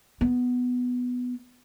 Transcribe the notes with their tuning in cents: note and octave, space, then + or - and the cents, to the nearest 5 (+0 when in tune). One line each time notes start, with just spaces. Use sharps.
B3 +5